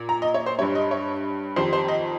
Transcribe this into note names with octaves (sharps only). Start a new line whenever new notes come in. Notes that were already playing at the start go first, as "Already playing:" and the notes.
Already playing: A#2
A#5
D#5
C#5
C5
G2 G3 C#5
D#5
C#5
F2 D#3 G3 C5
C5
D#5